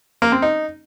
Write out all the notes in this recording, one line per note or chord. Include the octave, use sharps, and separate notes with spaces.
A#3
C4
D#4